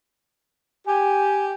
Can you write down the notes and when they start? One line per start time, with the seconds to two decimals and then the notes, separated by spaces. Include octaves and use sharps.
0.87 G4 G#5